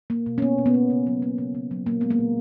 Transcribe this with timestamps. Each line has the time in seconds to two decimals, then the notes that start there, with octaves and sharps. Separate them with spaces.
0.10 A#3
0.26 B2
0.38 C#4
0.42 A#3 B3
0.58 B2
0.66 B3
0.74 A#3
0.90 C#3
1.07 F#3
1.22 A#3
1.38 C#3
1.55 C#3
1.71 F#3
1.86 A#2 A#3
2.01 G#3 B3
2.10 A#3
2.19 A#2